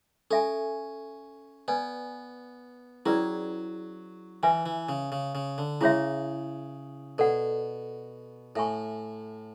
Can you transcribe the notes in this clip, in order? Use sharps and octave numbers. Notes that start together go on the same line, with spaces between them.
C#4 A4 E5 G#5
B3 B4 D5 G#5
F#3 C#4 E4 G#4 B4 D5
E3 B4 E5 G#5
E3
C#3
C#3
C#3
D3
C#3 E4 G#4 C#5 E5
B2 A4 D5 F#5
A2 A4 E5 G#5 C#6